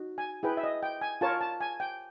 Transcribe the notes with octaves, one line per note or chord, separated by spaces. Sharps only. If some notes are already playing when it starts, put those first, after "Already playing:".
Already playing: D#4 F#4
G#5
E4 G#4 B4 G5
E5
D#5
G5
G#5
F4 A#4 C#5 A5
A5
G#5
G5